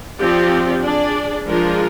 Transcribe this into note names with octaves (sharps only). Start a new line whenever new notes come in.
F3 C4 G4 D5
D4 G#4 D5
F3 G#3 D4 F4 A#4